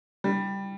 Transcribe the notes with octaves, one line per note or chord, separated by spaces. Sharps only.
G3